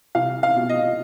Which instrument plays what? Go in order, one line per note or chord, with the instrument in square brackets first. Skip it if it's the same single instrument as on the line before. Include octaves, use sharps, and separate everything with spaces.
[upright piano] C2 F5
F5
B2
D#5